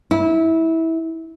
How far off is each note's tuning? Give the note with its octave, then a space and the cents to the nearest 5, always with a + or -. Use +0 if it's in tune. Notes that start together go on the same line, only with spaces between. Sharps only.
E4 -20